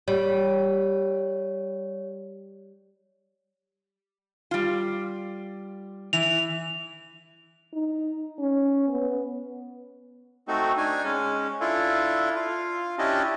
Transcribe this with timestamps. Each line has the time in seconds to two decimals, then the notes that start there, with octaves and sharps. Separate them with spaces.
0.08 G3 C#5
4.51 G3 F4
6.13 E3 F7
7.73 D#4
8.39 C#4
8.88 B3
10.48 A3 C4 D#4 F#4
10.77 D4 D#4 G#5
11.04 G#3 C#4
11.61 D4 E4 F4 A4
12.36 F4
12.99 C#4 D4 E4 G4 D#5 A5